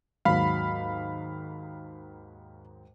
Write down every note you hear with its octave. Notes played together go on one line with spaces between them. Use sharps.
D#2 G#2 F#3 F5 B5